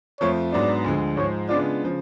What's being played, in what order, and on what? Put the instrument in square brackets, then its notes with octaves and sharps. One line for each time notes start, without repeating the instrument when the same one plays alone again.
[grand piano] F2 F3 A3 F4 [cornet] C#5
[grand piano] G#2 F#3 B3 D4 [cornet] D5
[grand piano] D2 D3 F3 G#3
[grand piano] G#2 F3 G#3 [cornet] C#5
[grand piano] C#3 G#3 B3 D4 F4 [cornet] D5
[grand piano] C#3 F3